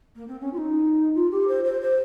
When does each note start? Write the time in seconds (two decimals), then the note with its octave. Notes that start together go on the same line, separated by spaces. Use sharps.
0.15 A#3
0.27 C4
0.40 C#4
0.53 F4
0.57 D#4
1.14 F4
1.31 G4
1.47 C5
1.64 C5
1.81 C5